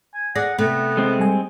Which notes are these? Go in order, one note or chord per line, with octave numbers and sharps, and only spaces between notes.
G#5
G#4 D5 F#5 A#6
C3 A3 B3
G#3 C4
G3 G#5